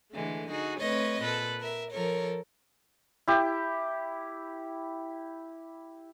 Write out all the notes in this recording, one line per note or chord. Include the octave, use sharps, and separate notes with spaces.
D3 E3 G#3 A3
D#4 F#4 G#4
A3 C4 B4 C#5 D#5
A#2 A4 B4
A#4 E5
F3 A4 A#4 C#5
E4 G4